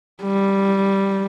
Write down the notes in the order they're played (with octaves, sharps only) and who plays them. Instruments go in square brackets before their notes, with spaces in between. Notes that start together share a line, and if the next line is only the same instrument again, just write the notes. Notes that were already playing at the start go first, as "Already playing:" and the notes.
[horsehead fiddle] G3